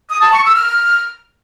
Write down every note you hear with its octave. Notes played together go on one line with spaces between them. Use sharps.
D#6
A5
C#6
E6
F6